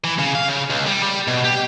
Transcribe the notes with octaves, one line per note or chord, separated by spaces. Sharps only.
E3
C#3
F5
C#3
C#2
G3
G3
B2
G4